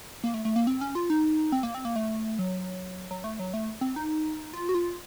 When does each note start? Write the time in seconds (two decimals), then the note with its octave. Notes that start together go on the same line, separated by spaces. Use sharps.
0.24 A#3
0.34 A3
0.45 A3
0.56 A#3
0.67 C4
0.81 C#4
0.95 F4
1.10 D#4
1.52 C4
1.63 A#3
1.75 C4
1.85 A#3
1.96 A3
2.39 F#3
3.11 F#3
3.24 A3
3.39 F#3
3.54 A3
3.81 C4
3.96 D#4
4.53 F4
4.69 F#4
4.74 F4